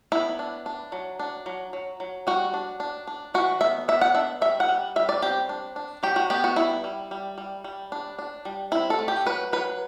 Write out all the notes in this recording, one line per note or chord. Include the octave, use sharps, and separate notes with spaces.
B3 E4
D4
D4
F#3
D4
F#3
F#3
F#3
G3 F#4
D4
D4
D4
E3 F#4
B3 E5
B3 E5
F#5
D4 E5
G3 E5
F#5
G3
G3 E5
D5
C4 G4
D4
D4
F#3 G4
F#4
B3 G4
F#4
G3 E4
G3
G3
G3
G3
D4
D4
G3
C4 E4
A4
A3
G4
F#3 B4
F#3 B4